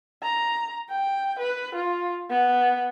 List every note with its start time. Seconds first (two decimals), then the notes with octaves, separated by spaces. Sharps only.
0.23 A#5
0.90 G5
1.39 B4
1.75 F4
2.30 B3